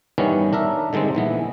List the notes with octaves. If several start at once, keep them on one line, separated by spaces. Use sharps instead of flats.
G2 D#3 E3 G3 B3 C#4
D4 A#4 E5
D3 D#3 G3 G#3 C4
A#1 E3 B3